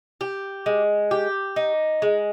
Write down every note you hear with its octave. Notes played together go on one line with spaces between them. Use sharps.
G4
G#3
G4
D#4
G#3